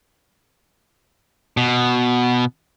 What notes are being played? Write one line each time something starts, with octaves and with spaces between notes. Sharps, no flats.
B2